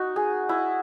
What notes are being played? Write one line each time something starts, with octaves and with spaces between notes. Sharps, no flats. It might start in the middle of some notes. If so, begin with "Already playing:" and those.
Already playing: D#4 F#4
G#4
E4